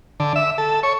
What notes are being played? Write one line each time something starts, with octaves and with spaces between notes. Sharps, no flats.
D3
E5
A4
C#5